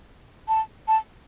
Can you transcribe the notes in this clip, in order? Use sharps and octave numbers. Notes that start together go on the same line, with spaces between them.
A5
A5